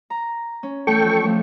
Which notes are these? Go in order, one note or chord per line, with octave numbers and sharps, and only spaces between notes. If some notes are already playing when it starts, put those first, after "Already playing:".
A#5
C#4
E2 A3 A4 G5 C#6
F2
C3 F3 A3